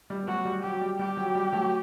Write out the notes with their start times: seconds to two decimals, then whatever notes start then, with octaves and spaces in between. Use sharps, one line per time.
0.10 G3
0.22 B3
0.27 F#3 A3 F#4
0.45 G3
0.64 F#3 G4
0.81 G3
0.99 G3 G4
1.17 F#3
1.35 G3
1.53 F#3 A3